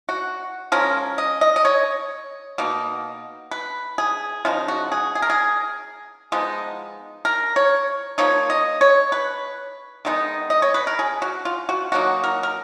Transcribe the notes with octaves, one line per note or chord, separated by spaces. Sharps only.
F#4
F3 G#3 C#4 A#4
D#5
D#5
D#5
C#5
B2 A#3 D#4
B4
G#4
C#3 F3 G#3 D#4 F4
F#4
G#4
G#4
A#4
G#4
F3 G#3 B3 D#4
A#4
C#5
F3 A#3 D#4 C#5
D#5
C#5
B4
D#3 G#3 B3 D#4
D#5
C#5
B4
A#4
G#4
F#4
F4
F#4
B2 F#3 A#3 D#4 F#4
A#4
A#4